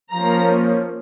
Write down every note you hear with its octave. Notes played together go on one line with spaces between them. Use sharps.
F3 A#3 C#4 A#5